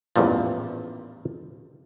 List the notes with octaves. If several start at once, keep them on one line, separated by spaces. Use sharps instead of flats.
A1 E2 G2 A#2 F3